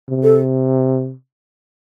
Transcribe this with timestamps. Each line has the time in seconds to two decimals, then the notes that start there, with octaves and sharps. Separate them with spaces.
0.09 C3
0.23 A4